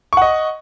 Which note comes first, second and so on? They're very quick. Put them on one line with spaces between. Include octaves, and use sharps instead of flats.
C#6 F#5 D#5